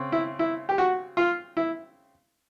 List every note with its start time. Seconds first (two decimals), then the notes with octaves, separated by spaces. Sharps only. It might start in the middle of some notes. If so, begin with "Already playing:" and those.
Already playing: C#3 C4
0.12 E4
0.39 E4
0.69 G4
0.78 F#4
1.17 F4
1.57 E4